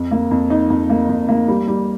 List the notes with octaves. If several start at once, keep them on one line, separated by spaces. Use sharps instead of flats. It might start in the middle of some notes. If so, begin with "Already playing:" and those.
Already playing: F2
A#3
F2
D#4
F2
A#3
F2
A#3
G3
G3